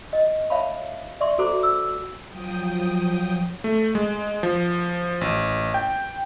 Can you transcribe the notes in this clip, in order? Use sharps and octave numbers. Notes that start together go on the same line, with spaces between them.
D#5
C#5 E5 F5 A5 B5
D5 E5 C6 C#6
F#4 A4 C5 A#5 D6
E6
F3 F#3 G5 D#6
A3
G#3
F3
A1
G5